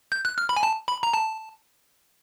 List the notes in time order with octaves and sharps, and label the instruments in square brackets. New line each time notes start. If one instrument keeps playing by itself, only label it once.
[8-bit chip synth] G6
F#6
F6
B5
G#5
A5
B5
A#5
A5